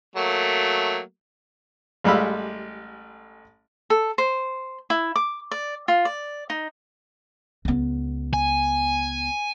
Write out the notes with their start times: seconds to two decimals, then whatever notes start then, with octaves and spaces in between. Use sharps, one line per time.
0.16 F#3 A3 A#3
2.04 A1 G3 G#3 F5 B5 E6
3.90 A4
4.18 C5
4.90 E4
5.16 D6
5.51 D5
5.88 F4
6.05 D5
6.50 D#4
7.65 C#2 B3
8.33 G#5